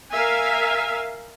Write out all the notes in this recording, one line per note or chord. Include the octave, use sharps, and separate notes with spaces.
A#4 E5 F5 G#5